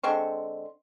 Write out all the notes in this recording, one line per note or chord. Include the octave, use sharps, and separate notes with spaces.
D3 G#3 C4 C#6